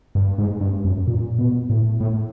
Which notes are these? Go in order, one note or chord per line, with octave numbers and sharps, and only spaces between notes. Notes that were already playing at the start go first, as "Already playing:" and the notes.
G2
G#2
G2
F#2
A#2
B2
A2
A2